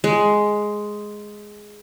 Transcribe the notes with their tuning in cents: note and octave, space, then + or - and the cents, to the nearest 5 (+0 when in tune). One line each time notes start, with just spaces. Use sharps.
G#3 +5